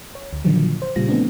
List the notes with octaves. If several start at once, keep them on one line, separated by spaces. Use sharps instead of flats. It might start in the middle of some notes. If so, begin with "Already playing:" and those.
C#5
D2
A#2 D3 D#3 F3 F#3
C5
A#2 C#3 G3 F4 A#6
E3 F3 A3 B3 C4 D4